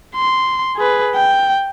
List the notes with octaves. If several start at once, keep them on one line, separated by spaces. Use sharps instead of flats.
C6
G#4 B4
G5